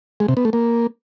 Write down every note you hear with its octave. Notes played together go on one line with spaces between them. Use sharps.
G#3
C3
B3
A3
A#3